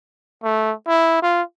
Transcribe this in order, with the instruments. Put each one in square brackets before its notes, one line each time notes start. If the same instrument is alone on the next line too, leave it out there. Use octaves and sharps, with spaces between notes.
[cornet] A3
E4
F4